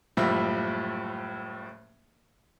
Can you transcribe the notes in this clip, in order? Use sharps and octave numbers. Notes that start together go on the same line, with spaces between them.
F#1 A2 F3 G3 E5